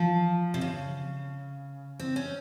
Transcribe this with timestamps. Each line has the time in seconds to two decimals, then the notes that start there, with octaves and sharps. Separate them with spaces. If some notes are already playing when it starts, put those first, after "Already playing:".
Already playing: F3
0.54 C3
0.61 C#3
2.00 C4
2.16 C#4